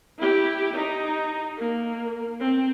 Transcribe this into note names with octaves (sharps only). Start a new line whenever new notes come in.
E4 G4
D#4
A#3
C4